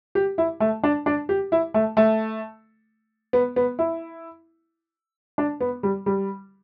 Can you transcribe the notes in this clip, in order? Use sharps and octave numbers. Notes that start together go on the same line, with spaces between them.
G4
E4
A3
D4
D4
G4
E4
A3
A3
B3
B3
E4
D4
B3
G3
G3